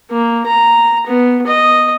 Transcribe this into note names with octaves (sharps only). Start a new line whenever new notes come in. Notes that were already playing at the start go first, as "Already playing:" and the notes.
A#3
A#5
B3
D#5